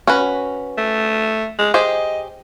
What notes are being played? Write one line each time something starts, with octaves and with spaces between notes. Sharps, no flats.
C#4 F#4 B4
A3
G#3
G4 G#4 C5 D#5